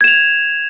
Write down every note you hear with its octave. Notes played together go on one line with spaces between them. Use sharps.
G#6 E7 F7